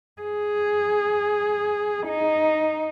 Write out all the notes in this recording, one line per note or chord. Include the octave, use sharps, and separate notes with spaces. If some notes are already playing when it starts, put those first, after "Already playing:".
G#4
D#4